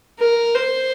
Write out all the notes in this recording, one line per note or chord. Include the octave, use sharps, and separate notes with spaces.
A#4
C5